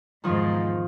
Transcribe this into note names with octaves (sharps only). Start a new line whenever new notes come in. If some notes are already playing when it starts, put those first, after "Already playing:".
E2 G#2 B2 D#3 F3